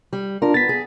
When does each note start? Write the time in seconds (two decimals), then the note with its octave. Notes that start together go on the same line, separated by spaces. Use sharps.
0.13 G3
0.42 D4 F4 A#4
0.54 B3 A6 B6
0.69 G#4